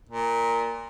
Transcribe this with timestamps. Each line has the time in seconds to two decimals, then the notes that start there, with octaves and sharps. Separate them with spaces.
0.09 A#2